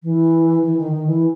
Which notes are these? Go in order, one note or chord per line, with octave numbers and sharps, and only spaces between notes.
E3
E3
D#3
D#3
E3